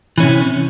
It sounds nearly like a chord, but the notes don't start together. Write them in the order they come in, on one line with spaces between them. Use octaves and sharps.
E3 C#4 C3